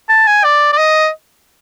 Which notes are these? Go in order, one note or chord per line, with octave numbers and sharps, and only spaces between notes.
A5
G#5
D5
D5
D#5